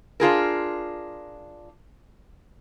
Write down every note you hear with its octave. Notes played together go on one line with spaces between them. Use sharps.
D4 F4 G#4 A#4